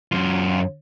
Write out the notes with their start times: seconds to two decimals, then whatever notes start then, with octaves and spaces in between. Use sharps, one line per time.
0.12 F#2 F4